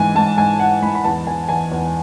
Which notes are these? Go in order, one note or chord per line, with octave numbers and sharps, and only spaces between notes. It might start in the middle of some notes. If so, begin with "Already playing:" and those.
Already playing: G#2 E3 G#5
G#2 A5
G#2 G#5
G#2 F#5
G#2 B5
B5
E2 A5
E2 G#5
E2 G#5
E2